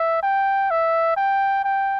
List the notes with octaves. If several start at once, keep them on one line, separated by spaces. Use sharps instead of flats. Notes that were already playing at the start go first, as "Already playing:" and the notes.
Already playing: E5
G5
E5
G5
G5